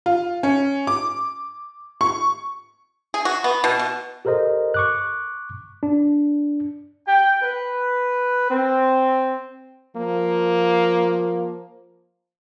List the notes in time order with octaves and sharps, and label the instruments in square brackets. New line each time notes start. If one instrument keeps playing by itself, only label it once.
[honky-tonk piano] F4
C#4
D6
C#6
[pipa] G#4
F#4
B3
B2
B2
[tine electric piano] G4 A4 A#4 C5 D#5
C#6 D6 F#6
D4
[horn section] G5
B4
C4
[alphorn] F3 [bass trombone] A#3